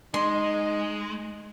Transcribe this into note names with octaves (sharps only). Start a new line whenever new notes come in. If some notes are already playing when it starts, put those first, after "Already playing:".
G#3 D#4 C6